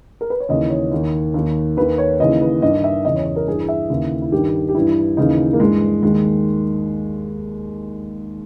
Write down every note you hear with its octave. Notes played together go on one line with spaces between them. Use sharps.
A#4
B4
C#5
D#2 C#3 E3 D#5
C#5
D#2 D#3
D#2 D#3
D#2 D#3 B4
C#5
D#2 C#3 E3 D#5
B4
G2 D#3 D#5
E5
E2 C#3 E3 D#5
C#5
C#5
A#4
G2 E3 G#4
E5
D#2 C#3 E3
E4
G2 D#3 G4
G4
G2 E3 E4
D#2 C#3 E3 D#4
A#3
G2 E3 G#3
D#2 D#3 G#3